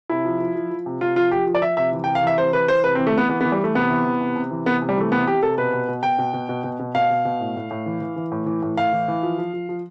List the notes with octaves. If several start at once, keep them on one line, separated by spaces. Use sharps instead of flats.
C3 E4
F3
F3
F3
F3
C3
C3 F4
F3 F4
F3 G4
F3
D5
F3 E5
C3 E5
E3
G5
C3
F5
E3 E5
C3 C5
E3 B4
E3 C5
C3 B4
C4
E3
A3
E3 B3
E3 B3
B3
E3
G3
E3 A3
C3 B3
E3
E3
C3
C3
E3
C3 B3
C3
G3
E3 A3
C3 B3
C3 G4
C3 A4
B2 B4
B2
B2
B2 G5
B2
B2
B2
B2
B2
B2 F5
B2
B2
A2
A2
A2
E3
E3
E3
A2
E3
A2
A2 F5
E3
E3
F3
F3
F3
F3